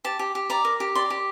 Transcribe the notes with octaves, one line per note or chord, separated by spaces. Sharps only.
G4 A5
G4
G4
D5 A#5
A#4
G4
D5 C6
G4